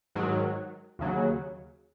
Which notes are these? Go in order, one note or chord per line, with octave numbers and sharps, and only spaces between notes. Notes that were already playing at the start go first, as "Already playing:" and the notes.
G#2 D#3 F#3
D#2 C#3 F#3